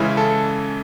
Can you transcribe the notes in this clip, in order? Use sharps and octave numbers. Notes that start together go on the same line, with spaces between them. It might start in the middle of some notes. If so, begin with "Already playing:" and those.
Already playing: C#3 E3 G#3 C#4 E4
A4